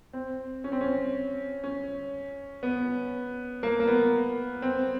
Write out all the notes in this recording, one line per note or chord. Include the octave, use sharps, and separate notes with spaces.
C4
C#4
C4
C#4
C#4
B3
A#3
A#3
B3
C4